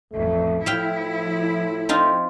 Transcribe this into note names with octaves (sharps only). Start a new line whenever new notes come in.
A1 F2 A3
A2 F3 E4 E5 F5 G5
C4 D#4 F4